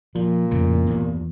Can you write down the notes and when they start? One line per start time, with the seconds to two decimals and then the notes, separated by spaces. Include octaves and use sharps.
0.15 A#2 F3
0.51 F2 A2 C#3
0.87 E2 G2